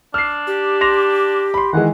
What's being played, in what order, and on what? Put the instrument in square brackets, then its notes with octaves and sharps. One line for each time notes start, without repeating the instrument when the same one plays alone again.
[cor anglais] D4 [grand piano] F6 C7
[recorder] G4
[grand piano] C6 A#6 F7
B5 C6
[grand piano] D#3 E3 G#3 [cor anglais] F#5